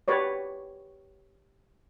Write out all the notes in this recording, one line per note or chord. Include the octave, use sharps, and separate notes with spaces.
G4 B4 C#5 D5